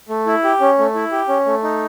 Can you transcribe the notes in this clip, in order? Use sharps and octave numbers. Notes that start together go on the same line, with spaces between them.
A3
E4
G4
C#4
A3
E4
G4
C#4
A3
D#4